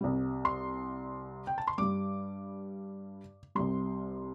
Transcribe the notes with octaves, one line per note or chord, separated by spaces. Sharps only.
C2 C3 G3
C6
G5
A5
C6
G2 G3 D6
C2 C3 G3 C6